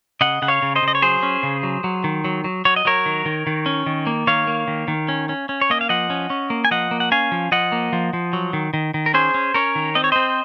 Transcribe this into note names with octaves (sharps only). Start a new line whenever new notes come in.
C#3 D#5 F#5
C#3 F#5
C#5 F5
C#3
C5 D#5
C#3
D#5
C#5
F#3 G#4 C5
C#4
C#3
F#3
F#3
D#3
F#3
F#3
F#3 C#5
D#5
F#3 A#4 C#5
D#3
D#3
D#3
C#4
D#3
A#3
D#3 C#5 F5
A#3
D#3
D#3
C#4
C#4
C#4
C#5
A#3 D#5
F5
F3 D#5 F#5
C#4
C#4
A#3
G#5
F3 D#5 F#5
A#3
F#5
C#4 F5 G#5
F3
F3 D#5 F#5
A#3
F3
F3
F#3
D#3
D#3
D#3
A#4
C#4 G#4 C5
C#4
C#4 A#4 C#5
D#3
C4 D#5
C#5
C4 C5 D#5